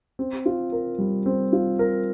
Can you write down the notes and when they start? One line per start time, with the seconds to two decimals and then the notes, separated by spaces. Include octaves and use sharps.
0.19 C4
0.46 F4
0.72 A#4
0.98 G3
1.26 C4
1.53 F4
1.79 A#4